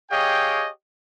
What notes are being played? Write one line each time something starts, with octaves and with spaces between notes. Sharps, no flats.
G4 G#4 C#5 D#5 F5 G5